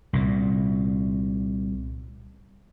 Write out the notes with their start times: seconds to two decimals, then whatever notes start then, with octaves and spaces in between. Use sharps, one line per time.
0.13 C2 A#2